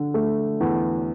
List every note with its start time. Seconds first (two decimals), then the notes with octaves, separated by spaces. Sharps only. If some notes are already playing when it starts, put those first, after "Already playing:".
Already playing: D3
0.14 A3
0.60 E2